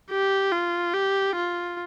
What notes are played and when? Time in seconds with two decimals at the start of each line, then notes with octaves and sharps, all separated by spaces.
0.11 G4
0.52 F4
0.94 G4
1.36 F4